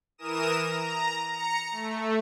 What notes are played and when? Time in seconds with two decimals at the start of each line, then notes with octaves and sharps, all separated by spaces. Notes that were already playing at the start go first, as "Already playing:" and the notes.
0.18 E3 A#4 D#6 E7
0.61 A#5
1.32 A#5 C#7
1.71 A3